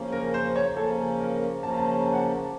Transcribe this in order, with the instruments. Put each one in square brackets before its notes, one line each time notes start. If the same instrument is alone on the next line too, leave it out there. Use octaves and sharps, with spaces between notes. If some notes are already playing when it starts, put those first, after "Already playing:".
Already playing: [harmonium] C#3 F3 A#3 C#4
[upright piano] A#4
C5
C#5
[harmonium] C#3 F3 A#3 C#4 [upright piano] A4
[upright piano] A#4
[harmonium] C#3 F3 A#3 C#4 [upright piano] A5
[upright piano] A#5
A5
A5
F#5
A5